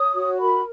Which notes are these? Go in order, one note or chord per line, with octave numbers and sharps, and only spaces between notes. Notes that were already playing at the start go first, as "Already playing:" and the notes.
Already playing: C#5 D#6
F#4
A#4 B5